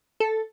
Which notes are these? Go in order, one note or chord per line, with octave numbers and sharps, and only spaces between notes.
A4